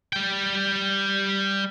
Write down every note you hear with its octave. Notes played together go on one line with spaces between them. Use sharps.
G3 G5